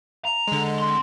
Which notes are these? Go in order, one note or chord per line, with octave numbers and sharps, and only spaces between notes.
A#5
D3 G#3
C4 C6